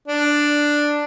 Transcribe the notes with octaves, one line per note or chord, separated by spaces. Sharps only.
D4